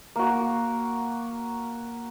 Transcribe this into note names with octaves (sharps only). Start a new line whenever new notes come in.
A#3 F#4